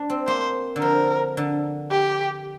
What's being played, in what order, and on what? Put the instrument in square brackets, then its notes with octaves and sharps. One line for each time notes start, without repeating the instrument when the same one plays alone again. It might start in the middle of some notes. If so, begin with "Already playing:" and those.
Already playing: [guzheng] D4
C4
[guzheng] A#3 [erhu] C5
[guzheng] D3
[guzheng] F3 [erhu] A#4
[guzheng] D3
[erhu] G4